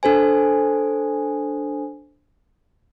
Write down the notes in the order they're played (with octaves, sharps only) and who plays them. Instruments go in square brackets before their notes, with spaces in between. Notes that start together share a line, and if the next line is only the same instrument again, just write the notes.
[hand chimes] D4 A4 C5 G#5